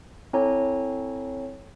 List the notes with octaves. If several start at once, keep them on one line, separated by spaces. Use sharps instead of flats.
C4 E4 A4 C#5 G#5 A#5